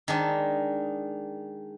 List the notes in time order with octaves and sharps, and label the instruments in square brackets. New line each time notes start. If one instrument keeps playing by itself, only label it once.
[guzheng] D#3 G#3 D4